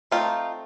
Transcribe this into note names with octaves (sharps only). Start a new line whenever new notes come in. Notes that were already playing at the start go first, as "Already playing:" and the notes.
A3 C4 D#4 F4